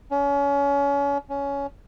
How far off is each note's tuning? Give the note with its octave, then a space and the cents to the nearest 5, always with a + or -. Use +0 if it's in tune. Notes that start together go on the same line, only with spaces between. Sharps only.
C#4 +30
C#4 +15